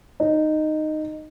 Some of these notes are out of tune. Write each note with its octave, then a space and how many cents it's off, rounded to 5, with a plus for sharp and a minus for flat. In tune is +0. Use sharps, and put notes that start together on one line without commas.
D#4 -10